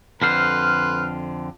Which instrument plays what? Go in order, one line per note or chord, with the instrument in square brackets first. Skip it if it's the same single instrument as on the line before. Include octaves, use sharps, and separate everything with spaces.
[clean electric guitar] F2 D3 C5 [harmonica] B4 C6 [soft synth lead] F6